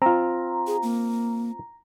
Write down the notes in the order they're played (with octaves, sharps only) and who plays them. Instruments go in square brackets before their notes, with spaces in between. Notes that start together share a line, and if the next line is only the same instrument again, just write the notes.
[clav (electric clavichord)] C4 F4 [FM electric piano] A#5
[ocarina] G#4
A#3